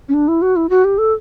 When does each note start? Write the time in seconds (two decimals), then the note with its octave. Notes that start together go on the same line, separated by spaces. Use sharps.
0.09 C#4
0.14 D4
0.28 E4
0.42 F#4
0.56 E4
0.70 F#4
0.85 G4
0.98 A4